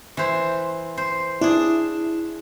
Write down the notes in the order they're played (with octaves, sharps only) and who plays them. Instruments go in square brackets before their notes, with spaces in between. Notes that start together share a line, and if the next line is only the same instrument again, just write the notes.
[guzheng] E3 C5
C5
[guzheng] D4 G#4 [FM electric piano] E4